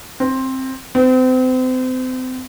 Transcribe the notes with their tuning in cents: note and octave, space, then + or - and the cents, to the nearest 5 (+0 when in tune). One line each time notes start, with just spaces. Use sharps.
C4 +10
C4 -35